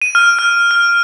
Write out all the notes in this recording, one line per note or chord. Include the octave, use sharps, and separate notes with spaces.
D#7
F6
F6
F6